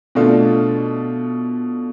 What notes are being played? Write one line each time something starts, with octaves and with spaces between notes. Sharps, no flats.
B2 A3 D4 F4